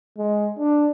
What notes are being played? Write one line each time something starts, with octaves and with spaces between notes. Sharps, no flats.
G#3
D4